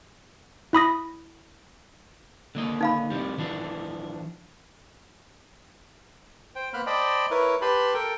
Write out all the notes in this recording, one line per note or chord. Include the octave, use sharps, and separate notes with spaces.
E4 B5 D#6 A#6
D3 A#3 D#5
D#4 F5 B5
C3 F3 G3
E3 F3 D4
C5 G5
A#3 B3 C5 B5 F6 F#6
C5 D5 D#5 G5 A5 B5
E4 A#4 B4 C#5
G4 B4 A5 B5 C6
A4 A#4 G5